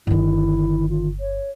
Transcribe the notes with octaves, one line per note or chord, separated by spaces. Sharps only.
G1 D3 D#3 E4
F4
C#5